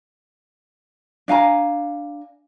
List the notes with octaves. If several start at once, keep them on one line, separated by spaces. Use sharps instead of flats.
D4 F5 G#5 A#5